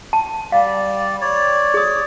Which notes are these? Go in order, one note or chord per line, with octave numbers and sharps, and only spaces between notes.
A5
G3 D5 F5
C#5 D5
G#4 D#6